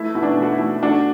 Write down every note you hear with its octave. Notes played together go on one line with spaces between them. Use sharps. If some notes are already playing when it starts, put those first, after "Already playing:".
Already playing: A3 E4
B2 E4
D4
A3
F#4
E4
A3
A3 D4 F#4